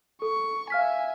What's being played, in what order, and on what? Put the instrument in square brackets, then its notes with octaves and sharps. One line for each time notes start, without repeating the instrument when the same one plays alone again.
[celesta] A4 [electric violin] C#6
[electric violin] E5 G#5 [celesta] F5 F6 B6